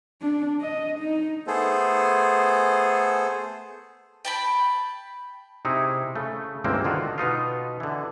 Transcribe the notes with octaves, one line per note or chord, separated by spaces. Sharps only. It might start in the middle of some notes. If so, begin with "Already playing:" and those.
D4
D#5
D#4
A3 B3 G#4 A4 C5
G5 A5 B5
C3 D#4 E4 G#4
C#3 A3
G1 C#2 E3 A#3 C4
D3 D#3 F4 F#4
B2 B3 D#4 F4
D3 E3